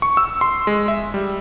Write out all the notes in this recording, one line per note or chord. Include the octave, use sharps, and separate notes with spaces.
C#6
E6
C6
G#3
E5
G3